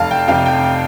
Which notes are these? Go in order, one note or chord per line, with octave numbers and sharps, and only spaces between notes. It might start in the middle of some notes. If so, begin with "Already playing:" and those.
Already playing: F1 F5 A5
G5
F2 C3 F5
G5